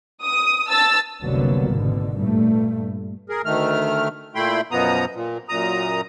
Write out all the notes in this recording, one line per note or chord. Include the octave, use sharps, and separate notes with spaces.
D#6
A5 E6 A6
F1 C2 D3 F#3 A#3 B3
G#1 B2 D3
G2 A#2 A3
G#4 A#4
D2 D#3 A3 F6
A#2 A3 E4 G5 B5 C6
F#2 B2 F3 B3 A#5 D#6
A#2
F#2 A#2 A#5 D#6